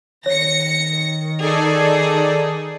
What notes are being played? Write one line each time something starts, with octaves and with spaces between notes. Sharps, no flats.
D#3 C#5 A#6 C#7
D#4 G#4 A4 D5